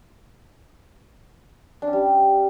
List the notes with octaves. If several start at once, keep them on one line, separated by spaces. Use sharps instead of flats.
D4
C#4
G3